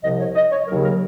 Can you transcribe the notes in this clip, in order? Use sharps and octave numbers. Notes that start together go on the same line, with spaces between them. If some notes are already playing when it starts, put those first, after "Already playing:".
C2 C3 F3 D#5
C#5
D#5
C#5
D#2 C#3 F#3 A#4
A#4